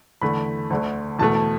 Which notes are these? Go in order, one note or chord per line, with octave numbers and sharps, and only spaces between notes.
E2 D3 A3 B5
D2 D3 A3
E2 B2 A3 A5
A5